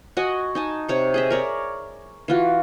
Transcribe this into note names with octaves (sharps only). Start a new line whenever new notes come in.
F#4 D#5 F#5 G#5
D#4 G#5 A5
C3 C#5 C#6
G#4 D#5 E5
A#4 C#5 D5
E3 F4 F#4